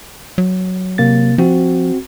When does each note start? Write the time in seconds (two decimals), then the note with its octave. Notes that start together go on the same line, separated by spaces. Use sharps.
0.38 F#3
0.98 C3 A#3 A6
1.38 F3 C4 F#4